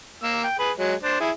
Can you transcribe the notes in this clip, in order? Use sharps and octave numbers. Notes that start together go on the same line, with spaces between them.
A#3 E6
G5
G#4 B4
F#3 G#3
D4 C5
E4 G#4